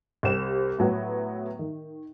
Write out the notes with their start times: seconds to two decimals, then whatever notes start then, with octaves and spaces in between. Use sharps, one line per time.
0.23 C2 G4 C5 E7
0.79 A2 F#3 B3
1.59 D#3